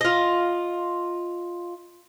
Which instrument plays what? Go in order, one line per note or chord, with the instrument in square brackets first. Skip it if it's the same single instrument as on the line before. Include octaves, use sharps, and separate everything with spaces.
[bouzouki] F4 D#5